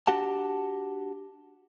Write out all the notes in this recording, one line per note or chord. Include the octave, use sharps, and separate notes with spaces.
D4 F#4 G4 F#5 A5